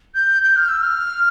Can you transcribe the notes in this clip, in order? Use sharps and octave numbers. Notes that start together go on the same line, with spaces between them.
G6
G6
F6
E6
F6